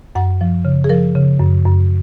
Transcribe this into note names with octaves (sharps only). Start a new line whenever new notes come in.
F#2 F#5
F3
C#3
G#4
F3 A#4
C#3
F#2
F#2